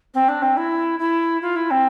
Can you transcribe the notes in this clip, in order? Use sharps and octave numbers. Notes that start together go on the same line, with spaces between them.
C4
D4
C4
E4
E4
F4
E4
C4